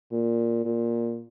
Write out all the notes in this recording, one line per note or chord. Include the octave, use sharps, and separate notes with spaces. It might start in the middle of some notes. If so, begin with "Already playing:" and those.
A#2
A#2